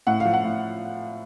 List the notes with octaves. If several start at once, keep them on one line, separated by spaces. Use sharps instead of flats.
A2 F#5
F5
F3
F#5
A2